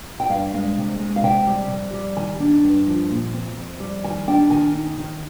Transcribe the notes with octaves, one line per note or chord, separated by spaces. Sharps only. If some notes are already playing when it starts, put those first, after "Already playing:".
G5
G2 F5
G#3 F5
C3
G#3
F5
C3 G5
G3
F2
G3
D#3 G#5
D4
G2
F3
A#2
C4
F2
G3
D#3 G#5
D4 G5
D#3 G#5
D#4
D#3